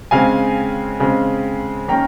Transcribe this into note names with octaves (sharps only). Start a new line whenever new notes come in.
C#3 G#3 C4 F5 G#5
C#3 G#3 C4
D#3 A#3 C#4 G5 A#5